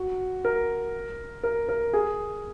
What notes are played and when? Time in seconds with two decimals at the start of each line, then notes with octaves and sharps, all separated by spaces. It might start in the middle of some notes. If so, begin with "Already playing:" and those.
Already playing: F#4
0.45 A#4
1.43 A#4
1.69 A#4
1.93 G#4